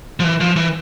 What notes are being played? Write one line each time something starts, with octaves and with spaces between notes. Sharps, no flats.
F3
E3
F3
E3